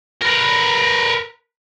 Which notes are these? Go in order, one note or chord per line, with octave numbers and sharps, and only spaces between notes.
A#4 B4